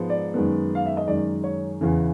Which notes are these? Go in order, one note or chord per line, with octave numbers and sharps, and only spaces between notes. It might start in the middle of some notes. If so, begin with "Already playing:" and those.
Already playing: G#2 F3 G#3 B3
D5
F#2 D#3 G#3 B3
F5
E5
D#5
F#2 D#3 G#3 D5
C#5
E2 C#3 E3